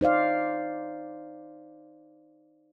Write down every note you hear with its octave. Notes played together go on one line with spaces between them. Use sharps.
D#4 C5 D5 F5